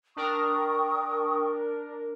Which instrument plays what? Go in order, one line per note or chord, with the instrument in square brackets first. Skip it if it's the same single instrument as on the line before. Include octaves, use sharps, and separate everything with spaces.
[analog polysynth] D4 A#4 [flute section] G5 C#6 D#6